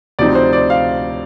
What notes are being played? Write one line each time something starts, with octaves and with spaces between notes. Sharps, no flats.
D2 C3 F3 C4 D#4 D5
C5
D5
F5